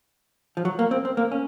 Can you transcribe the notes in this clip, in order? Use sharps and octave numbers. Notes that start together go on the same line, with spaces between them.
F3
F#3
A#3
C4
C4
A#3
C#4